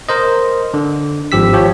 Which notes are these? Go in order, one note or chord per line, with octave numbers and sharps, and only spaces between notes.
A#4 C5 D#5
D3
G#1 F3 G4 E6 B6
F3 G4 C#5